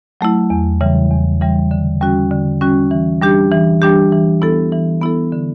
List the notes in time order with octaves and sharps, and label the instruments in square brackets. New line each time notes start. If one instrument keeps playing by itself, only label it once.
[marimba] F#3 A3 E4
E2
C#3 E3 G3
E2
C#3 E3 G3
D3
G3 C#4 F#4
D3
G3 C#4 F#4
E3
G3 D4 G4
E3
G3 D4 G4
E3
B3 E4 A4
E3
B3 E4 A4
D3